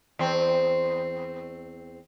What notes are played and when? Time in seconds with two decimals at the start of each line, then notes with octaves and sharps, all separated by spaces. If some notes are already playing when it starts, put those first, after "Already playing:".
0.19 E2 C4